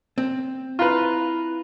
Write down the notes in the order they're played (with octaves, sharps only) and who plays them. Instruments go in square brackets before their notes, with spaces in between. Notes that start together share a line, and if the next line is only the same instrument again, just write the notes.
[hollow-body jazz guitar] C4
[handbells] E4 A#5 F#6 [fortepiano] F4 B4